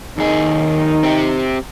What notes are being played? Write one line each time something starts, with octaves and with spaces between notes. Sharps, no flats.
D#2 D#3 D#4 G#4
C4 G4